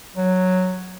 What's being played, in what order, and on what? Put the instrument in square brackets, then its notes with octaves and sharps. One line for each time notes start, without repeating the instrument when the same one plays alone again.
[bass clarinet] F#3